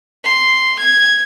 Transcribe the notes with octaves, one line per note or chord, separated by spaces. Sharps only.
C6
G#6